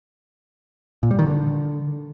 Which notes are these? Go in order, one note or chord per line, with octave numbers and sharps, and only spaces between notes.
A#2
G3
D#3
D3